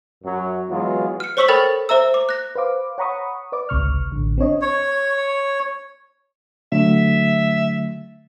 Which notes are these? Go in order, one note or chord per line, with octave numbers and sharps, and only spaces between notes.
F#2 F#3
E3 F#3 G#3 B3 F4
F6 C#7
C5 C#5 C#6 E6 B6 F#7
A4 A#4 G5 B5 F6 A6
C5 E5 A#5 E6
D6
F#6 A#6
B4 C5 F5 D6
C#5 F#5 A#5 B5 C#6 D#6
B4 D5 D6
G#1 C#2 C3 C#6 F6
A1 D3
C4 D4 C#5 D#5
C#5
D3 F#3 A3 E5